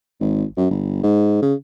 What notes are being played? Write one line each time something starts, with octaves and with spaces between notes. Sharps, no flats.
G#1
F#2
G1
G#2
C#3